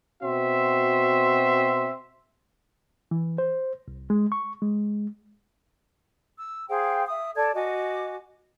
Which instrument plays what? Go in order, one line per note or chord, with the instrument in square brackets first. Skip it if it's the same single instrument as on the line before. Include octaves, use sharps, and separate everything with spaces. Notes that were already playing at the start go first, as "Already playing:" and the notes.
[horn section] B2 C4 F#4 E5 C6
[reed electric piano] E3
C5
C2
G#3
C#6
G#3
[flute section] E6
G#4 C5 F5 G5
E5 D#6
A4 D5 A5 G#6
F#4 D#5 G#5 D6